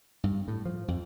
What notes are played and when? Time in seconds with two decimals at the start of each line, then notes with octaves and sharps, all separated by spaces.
0.24 G2
0.48 A2
0.65 F3
0.88 F2